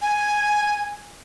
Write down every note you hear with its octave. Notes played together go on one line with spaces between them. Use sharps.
G#5